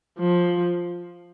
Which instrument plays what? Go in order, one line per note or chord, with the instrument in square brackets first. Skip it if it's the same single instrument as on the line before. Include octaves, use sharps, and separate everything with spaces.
[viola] F3